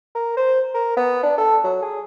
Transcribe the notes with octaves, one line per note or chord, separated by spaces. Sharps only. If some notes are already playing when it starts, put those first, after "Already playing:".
A#4
C5
A#4
B3
D4
A4
F#3
G#4